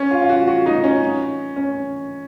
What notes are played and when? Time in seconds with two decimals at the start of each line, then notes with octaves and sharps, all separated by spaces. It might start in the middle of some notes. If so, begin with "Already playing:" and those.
Already playing: C#4
0.11 F4
0.22 F4
0.29 F#4
0.48 F#4
0.66 D#4
0.84 C#4
1.56 C#4